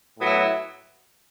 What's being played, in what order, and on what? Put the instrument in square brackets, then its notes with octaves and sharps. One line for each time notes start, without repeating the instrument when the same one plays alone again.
[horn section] A2 F#3 B3 E4